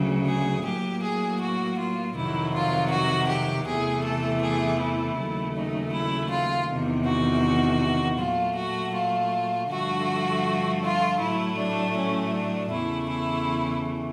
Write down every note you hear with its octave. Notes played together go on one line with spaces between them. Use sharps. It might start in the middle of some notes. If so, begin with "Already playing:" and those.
Already playing: D2 C#3 F#3
G#4
A2 F#3 A#3 G4
G#4
F#4
F4
F2 C3 D#3 F#3 E4
F4
F#4
G4
E2 C3 E3 A3 G#4
A4
G#4
E4
D#2 C#3 F#3 A3
D#4
E4
F4
E2 C3 D#3
F#4
A#2 F#3 A3 F4
F#4
F4
G2 D3 F3 A3 F#4
F4
A2 F#3 A3 E4
D4
C#4
D4
E2 C#3 E3 A3 E4
E4